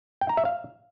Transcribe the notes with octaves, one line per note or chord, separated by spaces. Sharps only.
G5
A#5
E5
F5